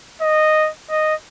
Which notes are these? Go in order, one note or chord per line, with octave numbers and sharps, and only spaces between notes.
D#5
D#5